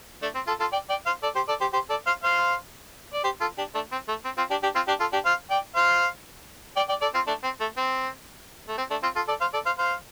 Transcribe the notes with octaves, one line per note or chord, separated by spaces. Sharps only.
A3 D4
C4
F4 A4
F4 A4
D5 G5
D5 G5
C5 F5
A4 D5
G4 C5
A4 D5
G4 C5
G4 C5
A4 D5
C5 F5
C5 F5
D5
G4 C5
F4 A4
D4 G4
A3 D4
C4
A3
C4
C4 F4
D4 G4
D4 G4
C4 F4
D4 G4
F4 A4
D4 G4
C5 F5
D5 G5
C5 F5
D5 G5
D5 G5
A4 D5
C4 F4
A3 D4
C4
A3
C4
A3
C4
A3 D4
C4 F4
F4 A4
A4 D5
C5 F5
A4 D5
C5 F5
C5 F5